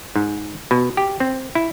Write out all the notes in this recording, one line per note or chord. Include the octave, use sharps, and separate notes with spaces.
G#2
B2
G4
C4
E4